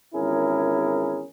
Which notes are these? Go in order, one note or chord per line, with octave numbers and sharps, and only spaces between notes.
G#1 E2 C#4 E4 G#4 A#4